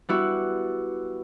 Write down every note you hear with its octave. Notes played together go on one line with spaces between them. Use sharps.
G3 B3 E4 F#4